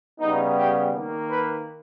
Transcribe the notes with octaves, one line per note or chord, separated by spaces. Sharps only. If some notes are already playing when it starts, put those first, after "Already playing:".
C#3 G3 B3 D#4
G4
D#3 A#3
B4